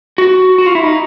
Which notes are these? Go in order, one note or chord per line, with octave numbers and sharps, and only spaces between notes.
F#4
F#4
F4
E4
D#4